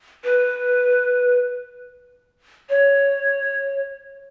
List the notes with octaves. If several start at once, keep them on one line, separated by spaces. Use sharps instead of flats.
B4
C#5